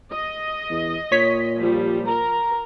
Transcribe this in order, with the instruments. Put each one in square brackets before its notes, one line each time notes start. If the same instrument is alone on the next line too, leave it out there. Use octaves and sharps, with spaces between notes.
[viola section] D#5
[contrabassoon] E2
[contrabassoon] A#2 [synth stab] C#5 B6
[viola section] F3 G3
[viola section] A#4 [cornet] A#5